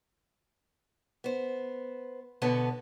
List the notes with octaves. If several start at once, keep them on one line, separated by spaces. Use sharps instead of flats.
B3 C5
B2 D3 B3 B4 C#5